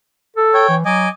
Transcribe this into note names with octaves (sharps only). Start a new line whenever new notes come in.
A4
C#5 G5
E3
F#3 D#5 G#5 D6